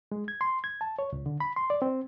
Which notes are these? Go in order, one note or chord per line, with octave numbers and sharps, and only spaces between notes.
G#3
G#6
C6
G#6
A5
C#5
C#2
D3
B5
C6
D5
C4